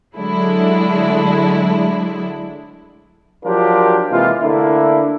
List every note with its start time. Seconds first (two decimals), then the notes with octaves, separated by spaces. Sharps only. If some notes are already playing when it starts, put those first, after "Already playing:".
0.15 D3 F#3 G#3 A3 D4 E4
3.44 F3 F#3 D4 F4 G4 A#4
4.11 C3 E3 G#3 A#3 F4
4.41 D3 A3 A#3 D4 E4